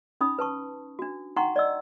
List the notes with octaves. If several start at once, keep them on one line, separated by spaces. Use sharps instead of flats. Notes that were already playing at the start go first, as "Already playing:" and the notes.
C#4 D#4 B5 D#6
B4 A5 C#6
D4 F#4
D#4 F#5 G5 A#5 C6 C#6
D5 D#5 E6